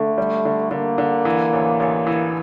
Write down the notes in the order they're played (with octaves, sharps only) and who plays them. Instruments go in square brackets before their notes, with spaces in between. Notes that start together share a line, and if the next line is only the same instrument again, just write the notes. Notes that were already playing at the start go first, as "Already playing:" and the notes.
Already playing: [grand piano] D3 [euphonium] A3
[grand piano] G3
D3
[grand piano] D3 [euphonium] A#3
[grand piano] D3
E3
A1
A1
E3